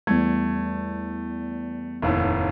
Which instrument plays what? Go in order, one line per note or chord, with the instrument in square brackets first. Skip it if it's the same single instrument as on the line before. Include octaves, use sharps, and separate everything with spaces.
[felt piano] E2 G3 G#6 [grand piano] A3
[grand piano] F1 D#2 A2